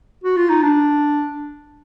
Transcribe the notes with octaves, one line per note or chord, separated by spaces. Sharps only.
F#4
F4
D#4
D4